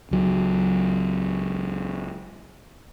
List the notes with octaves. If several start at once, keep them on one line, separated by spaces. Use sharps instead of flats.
C#2 F#3